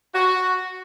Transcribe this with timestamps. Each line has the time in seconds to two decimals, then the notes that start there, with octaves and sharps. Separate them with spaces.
0.14 F#4